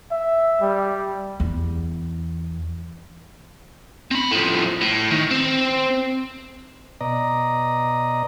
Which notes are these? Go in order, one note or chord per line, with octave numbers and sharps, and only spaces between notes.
E5
G3
E2
C4 B5
A2 F3
A2
D#3
C4
B2 D5 D#5 A#5